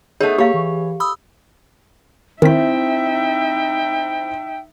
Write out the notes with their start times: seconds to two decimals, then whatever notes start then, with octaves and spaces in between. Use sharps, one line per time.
0.21 A3 B3 D#4 G#4 C#5
0.38 A#3 G4 C#5 F5
0.54 E3
1.00 B5 D#6 E6
2.42 D#3 C4 D#4 E4 E5 G5 B6